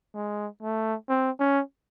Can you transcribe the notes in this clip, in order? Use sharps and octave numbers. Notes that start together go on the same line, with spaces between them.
G#3
A3
C4
C#4